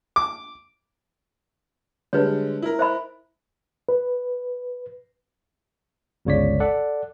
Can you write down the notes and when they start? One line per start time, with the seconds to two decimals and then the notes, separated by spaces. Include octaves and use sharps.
0.16 D6
2.13 D3 G3 G#3 B4 C#5
2.62 E4 A#4
2.79 C5 E5 B5
3.89 B4
6.25 G1 C#2 C#3 C#5 D5 B6
6.60 A4 D5 F#5